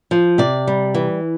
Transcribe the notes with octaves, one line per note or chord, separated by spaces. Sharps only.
F3
C3 D5
G3
E3